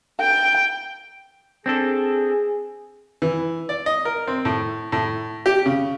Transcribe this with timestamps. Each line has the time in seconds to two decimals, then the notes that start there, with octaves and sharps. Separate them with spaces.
0.21 G5
1.66 C4 D4 G#4 A4
3.22 E3
3.69 D5
3.86 D#5
4.05 A#4
4.27 C4
4.45 A2
4.92 A2
5.46 G4
5.66 C#3